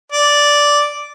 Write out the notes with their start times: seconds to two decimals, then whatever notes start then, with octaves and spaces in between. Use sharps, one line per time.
0.12 D5